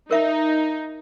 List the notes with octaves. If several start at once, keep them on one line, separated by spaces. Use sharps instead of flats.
D#4 A#4 E5